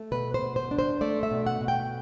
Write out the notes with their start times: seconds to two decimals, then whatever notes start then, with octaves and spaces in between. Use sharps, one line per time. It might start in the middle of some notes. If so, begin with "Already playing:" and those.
Already playing: A3
0.12 B2 B4
0.34 C5
0.42 B2
0.56 C5
0.71 D4
0.79 C5
1.01 A3 D5
1.23 E5
1.31 B2
1.47 F#5
1.61 B2
1.68 G5